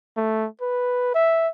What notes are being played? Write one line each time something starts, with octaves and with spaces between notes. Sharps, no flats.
A3
B4
E5